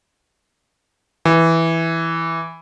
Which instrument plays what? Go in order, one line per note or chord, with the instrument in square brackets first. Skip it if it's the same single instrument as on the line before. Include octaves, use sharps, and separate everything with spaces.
[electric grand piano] E3